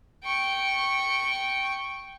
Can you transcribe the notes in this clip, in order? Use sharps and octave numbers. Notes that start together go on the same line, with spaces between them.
G5 C#6